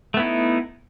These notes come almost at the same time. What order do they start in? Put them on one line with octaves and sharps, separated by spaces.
A3 B3 E4 D#4